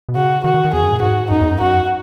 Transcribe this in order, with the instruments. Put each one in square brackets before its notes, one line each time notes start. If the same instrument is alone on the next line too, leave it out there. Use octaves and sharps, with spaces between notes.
[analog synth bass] B2
[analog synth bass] C#3 [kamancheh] F#4
[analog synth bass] D#3 [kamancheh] F#4
[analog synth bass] D#3
D#3
[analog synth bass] E2 [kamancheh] G#4
[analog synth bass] F#2
A#2
[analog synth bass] G#2 [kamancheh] F#4
[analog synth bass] F#2 [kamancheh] D#4
[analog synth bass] E2
F#2
[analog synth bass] F#2 [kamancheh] F#4